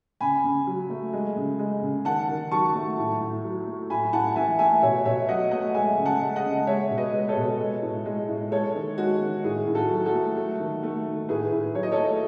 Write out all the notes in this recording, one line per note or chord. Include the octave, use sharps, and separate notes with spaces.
C#3 G#5 B5
C#3
F#3
A3
G#3
C#3
G#3
C#3
D#3 F#5 A5
D#3
F#3 A5 C#6
A3
A2
A2
F#3
A3
A2 G#5 B5
A2 F#5 A5
E3 E5 G#5
A3 E5 G#5
B2 C#5 E5
B2 C#5 E5
F#3 D#5 F#5
A3 D#5 F#5
G#3 E5 G#5
C#3
F#5 A5
G#3
D#5 F#5
C#3
G#3 C#5 E5
B2
B4 D#5
G#3
A4 C#5
B2
G#3
A2
G#3
A2
G#3 A4 C#5
D#3
G#3 F#4
D#3
A2 G#4
A2
F#4 A4
F#3
F#4 A4
A3
A3
D#3
A3
D#3
A2 G#4 B4
A2
F#3 C#5
D#5
A4 C#5
A3